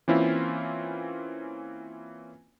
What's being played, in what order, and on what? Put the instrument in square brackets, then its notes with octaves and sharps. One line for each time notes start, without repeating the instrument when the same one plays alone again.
[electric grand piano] E3 A#3 C4 C#4 E4 F4